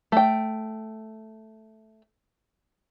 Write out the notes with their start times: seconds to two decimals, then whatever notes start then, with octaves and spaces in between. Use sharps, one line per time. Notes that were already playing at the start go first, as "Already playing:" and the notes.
0.12 A3 G5